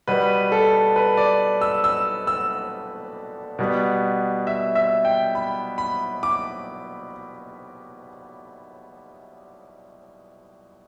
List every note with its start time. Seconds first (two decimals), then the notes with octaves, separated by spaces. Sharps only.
0.08 B2 G3 B3 B4
0.52 A4
0.96 B4
1.17 D5
1.61 E6
1.84 E6
2.27 E6
3.59 B2 G3 B3
4.47 E5
4.75 E5
5.05 G5
5.35 B5
5.78 B5
6.23 D6